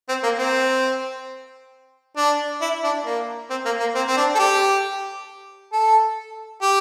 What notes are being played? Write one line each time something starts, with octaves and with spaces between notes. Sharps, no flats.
C4
A#3
C4
D4
E4
D4
A#3
C4
A#3
A#3
C4
C4
D4
A4
G4
A4
G4